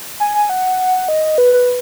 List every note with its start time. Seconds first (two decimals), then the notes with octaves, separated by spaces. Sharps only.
0.20 G#5
0.35 G#5
0.50 F#5
1.08 D#5
1.38 B4
1.53 B4